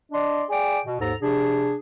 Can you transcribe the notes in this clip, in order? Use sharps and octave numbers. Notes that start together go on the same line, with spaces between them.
D4 D5 D#5 C6
G#4 D5 G5
B2
D#2 G#2 A4 A#5
C3 D4 G#4